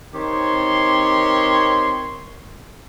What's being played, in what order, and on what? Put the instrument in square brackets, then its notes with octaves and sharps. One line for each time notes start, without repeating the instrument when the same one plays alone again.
[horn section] D#3 C4 G4 C#5 C6